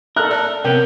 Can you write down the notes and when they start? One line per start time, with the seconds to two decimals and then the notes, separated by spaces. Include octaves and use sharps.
0.16 A4 A#4 E5 F6 F#6
0.31 D5
0.64 C3 B3 C#4 A#4 G5